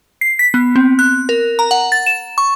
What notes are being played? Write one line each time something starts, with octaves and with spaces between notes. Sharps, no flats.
C7
B6
B3
C4
F#6
A#4
A#5
F#5
A6
E7
C#6